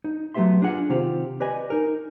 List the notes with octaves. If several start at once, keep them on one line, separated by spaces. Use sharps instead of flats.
D#4
F#3 A3 B3 G4 E5 C6
D4 F4 G#4 F#5
C3 D#3 C4 F4 G4
G4 B4 D5 D#5 G#5
D#4 A#4